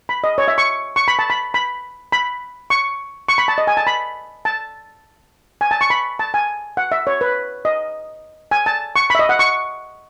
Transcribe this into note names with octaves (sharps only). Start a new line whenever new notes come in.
B5
D#5
C#5
E5
C#6
C#6
B5
A5
B5
B5
B5
C#6
C#6
B5
A5
D#5
G#5
A5
B5
A5
G#5
A5
C#6
B5
A5
G#5
F#5
E5
C#5
B4
D#5
G#5
A5
C#6
B5
E5
D#5
F#5
C#6